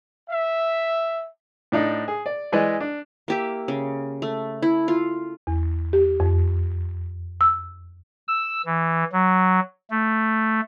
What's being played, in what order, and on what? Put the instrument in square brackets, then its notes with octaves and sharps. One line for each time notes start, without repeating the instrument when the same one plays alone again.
[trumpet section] E5
[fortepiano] A2 D4 D#4
G#4
D5
E3 G#3 B4 D5 D#5
D4
[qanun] A#3 G4 E5
C#3
A3
E4
F4
[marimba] E2
G4
F2
E6
[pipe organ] E6
E3
F#3
A3